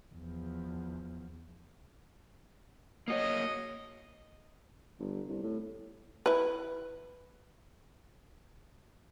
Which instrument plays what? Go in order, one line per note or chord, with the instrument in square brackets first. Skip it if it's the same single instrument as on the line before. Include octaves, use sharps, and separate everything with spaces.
[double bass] E2 F3
[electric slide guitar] A#3 F#4 C#5 [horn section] D#5
[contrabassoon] G1
C2
A2
[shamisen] E4 B4